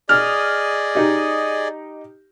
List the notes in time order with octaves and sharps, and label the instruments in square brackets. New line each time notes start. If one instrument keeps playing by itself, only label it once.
[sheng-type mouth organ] G#4 D5 D#5 [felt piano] F6
[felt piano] D#4 G4